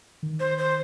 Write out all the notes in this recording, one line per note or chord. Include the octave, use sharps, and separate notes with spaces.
D#3
C5
C5